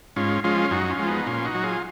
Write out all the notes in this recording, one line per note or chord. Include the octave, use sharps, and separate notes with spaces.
G#2 C#4 F4
F3 G#3 C#4 F4
F#2 D#4 F#4
C#4 F4
F3 G#3
B3 D#4
A#2 C#4 F4
D#4 F#4
F#3
F4 G#4